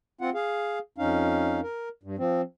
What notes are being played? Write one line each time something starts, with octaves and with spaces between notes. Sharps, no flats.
C4 F4 F#5
G#4 F5
F2 C#4 D#4 F5
A#4
G2
F3 C4